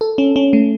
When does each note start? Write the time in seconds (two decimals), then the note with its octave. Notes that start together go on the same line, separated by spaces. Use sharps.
0.01 A4
0.18 C#4
0.36 C#4
0.53 A3